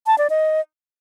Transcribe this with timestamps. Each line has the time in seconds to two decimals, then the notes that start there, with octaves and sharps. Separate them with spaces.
0.07 A5
0.18 D5
0.30 D#5